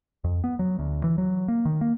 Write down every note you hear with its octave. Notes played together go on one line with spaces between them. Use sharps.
F2
B3
F#3
D2
E3
F#3
A#3
D#3
A#3